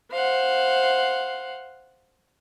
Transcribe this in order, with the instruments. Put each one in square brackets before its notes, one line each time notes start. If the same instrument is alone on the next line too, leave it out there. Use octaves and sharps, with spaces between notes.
[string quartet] C5 F5 F#5